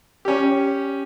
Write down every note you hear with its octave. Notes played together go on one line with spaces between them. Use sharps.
C#4 G4